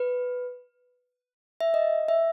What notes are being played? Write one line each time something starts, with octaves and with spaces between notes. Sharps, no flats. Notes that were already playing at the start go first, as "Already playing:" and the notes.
Already playing: B4
E5
D#5
E5